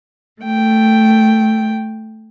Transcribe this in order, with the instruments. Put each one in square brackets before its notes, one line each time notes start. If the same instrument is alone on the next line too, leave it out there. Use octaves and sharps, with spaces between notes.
[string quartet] A3 G5